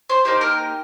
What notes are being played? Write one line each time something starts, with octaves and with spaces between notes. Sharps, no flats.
C5
A#3 D#4 G4 C5
A#4